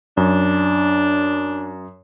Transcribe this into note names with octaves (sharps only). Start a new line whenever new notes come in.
F#2 D4